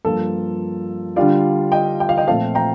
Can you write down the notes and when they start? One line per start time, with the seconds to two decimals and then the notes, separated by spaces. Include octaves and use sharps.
0.05 G2 F3 A#3 F4 A4
1.16 D3 G3 D4 F4 D5 F5
1.72 D#5 G5
2.00 G5
2.09 F5
2.18 D#5 G5
2.27 A#2 F3 A3 C4 F5 A5
2.55 G5 A#5